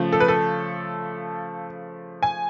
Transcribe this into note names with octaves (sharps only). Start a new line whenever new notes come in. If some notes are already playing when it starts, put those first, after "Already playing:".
Already playing: C#3 F3 A3
A4
B4
A4
G#5